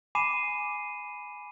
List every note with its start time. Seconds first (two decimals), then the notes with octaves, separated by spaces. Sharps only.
0.15 G#5 B5 D6 C7 D#7 E7